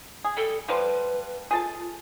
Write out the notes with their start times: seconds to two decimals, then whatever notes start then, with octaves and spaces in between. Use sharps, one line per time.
0.25 G#4
0.37 G3 A4
0.69 F3 G3 B4 C6
1.51 F4 G#4 A4 A5